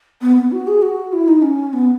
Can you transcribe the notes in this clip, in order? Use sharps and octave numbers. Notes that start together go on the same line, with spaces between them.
B3
B3
F#4
G#4
F#4
E4
D#4
C#4
B3